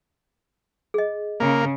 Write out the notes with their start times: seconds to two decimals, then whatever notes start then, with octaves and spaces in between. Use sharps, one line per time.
0.94 G#4 D#5
1.40 C#3 A#3